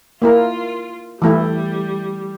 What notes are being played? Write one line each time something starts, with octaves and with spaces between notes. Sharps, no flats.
A#3 E4 F4 A#4
E3 G3 A3 E4